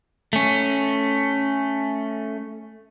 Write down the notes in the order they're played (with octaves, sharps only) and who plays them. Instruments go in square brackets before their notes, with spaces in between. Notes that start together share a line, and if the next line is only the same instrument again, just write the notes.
[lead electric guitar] A3 C#4